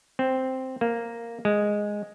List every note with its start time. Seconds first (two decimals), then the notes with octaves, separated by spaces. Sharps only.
0.19 C4
0.81 A#3
1.45 G#3